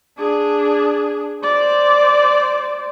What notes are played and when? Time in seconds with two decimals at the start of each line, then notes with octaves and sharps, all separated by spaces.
0.18 D4 G#4
1.43 C5 D5